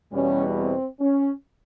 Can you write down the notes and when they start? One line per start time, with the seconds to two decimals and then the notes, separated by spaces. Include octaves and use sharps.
0.12 E2 B2 G3 C#4
0.56 C4
1.00 C#4